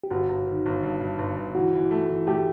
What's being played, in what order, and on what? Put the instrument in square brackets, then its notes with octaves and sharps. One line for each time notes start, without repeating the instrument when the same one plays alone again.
[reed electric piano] G4
[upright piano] G1 [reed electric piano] F#4
[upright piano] G1
D#3
G1
G2
G2
G1
G1
[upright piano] E3 [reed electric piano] F#4
[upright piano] E3
A3
E3
[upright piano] A3 [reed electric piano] G4